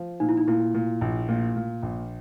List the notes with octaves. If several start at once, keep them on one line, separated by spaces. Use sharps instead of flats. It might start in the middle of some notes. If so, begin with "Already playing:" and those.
Already playing: F3
A#2 D#4
E4
D#4
A#2 E4
A#2
A#1
A#2
A#2
A#1